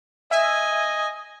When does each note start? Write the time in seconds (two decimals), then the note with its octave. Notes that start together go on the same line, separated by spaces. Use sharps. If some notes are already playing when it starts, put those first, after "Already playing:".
0.31 D#5 E5 G#5